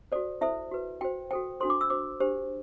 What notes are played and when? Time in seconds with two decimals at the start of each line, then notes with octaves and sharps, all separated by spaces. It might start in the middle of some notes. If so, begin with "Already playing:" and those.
0.12 F#4 A4 C5 D5
0.41 E4 A4 C5 E5
0.71 F#4 B4
1.01 F#4 C5 G5
1.31 F#4 A4 C5 G5
1.60 D4 F#4 A4 C5 C6
1.70 D6
1.81 E6
1.90 F#4 C5 D6
2.20 D4 G4 C5